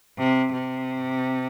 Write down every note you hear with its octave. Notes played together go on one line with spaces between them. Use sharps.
C3
C3